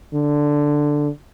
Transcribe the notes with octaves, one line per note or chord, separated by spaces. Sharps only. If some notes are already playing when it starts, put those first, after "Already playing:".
D3